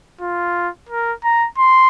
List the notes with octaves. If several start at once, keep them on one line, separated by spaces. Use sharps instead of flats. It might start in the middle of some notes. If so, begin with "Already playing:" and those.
F4
A#4
A#5
C6